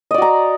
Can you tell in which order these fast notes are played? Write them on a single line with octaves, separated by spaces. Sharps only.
D#5 D5 F#4 A#5